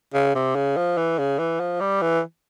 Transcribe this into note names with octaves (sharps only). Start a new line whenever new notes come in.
C#3
C3
C#3
F3
E3
C#3
E3
F3
G3
E3